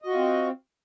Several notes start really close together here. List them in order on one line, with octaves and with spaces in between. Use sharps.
D#5 F#4 F4 C4